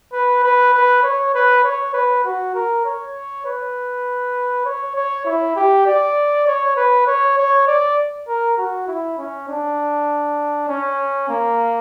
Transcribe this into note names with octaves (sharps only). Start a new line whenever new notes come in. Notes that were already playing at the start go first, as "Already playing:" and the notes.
B4
B4
B4
C#5
B4
C#5
B4
F#4
A#4
C#5
B4
C#5
C#5
E4
G4
D5
C#5
B4
C#5
C#5
D5
A#4
F#4
E4
C#4
D4
C#4
A#3